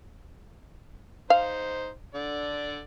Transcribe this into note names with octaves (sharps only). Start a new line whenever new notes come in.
D#4 C5 F5
D3 D5